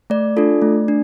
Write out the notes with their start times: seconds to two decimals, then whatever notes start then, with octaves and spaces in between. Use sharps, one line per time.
0.10 A3 D5
0.37 D4 F4 A4
0.62 A3
0.88 D4